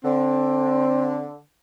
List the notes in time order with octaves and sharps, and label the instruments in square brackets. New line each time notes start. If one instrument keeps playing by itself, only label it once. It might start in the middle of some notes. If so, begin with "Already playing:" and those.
[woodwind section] D3 [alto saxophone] C4